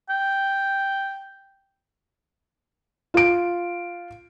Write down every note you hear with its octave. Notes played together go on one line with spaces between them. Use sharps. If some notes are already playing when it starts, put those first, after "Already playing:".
G5
F4 D7